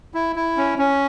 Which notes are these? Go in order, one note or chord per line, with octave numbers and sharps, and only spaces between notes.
E4
E4
C#4
C#4